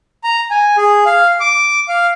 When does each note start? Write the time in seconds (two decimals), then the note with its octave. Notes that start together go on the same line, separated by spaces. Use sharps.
0.24 A#5
0.51 G#5
0.77 G#4
1.06 F5
1.40 D6
1.88 F5